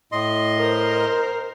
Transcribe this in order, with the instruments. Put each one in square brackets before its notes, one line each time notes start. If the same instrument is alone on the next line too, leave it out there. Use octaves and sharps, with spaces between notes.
[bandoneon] A2 D#5 C6
[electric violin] A#4 C5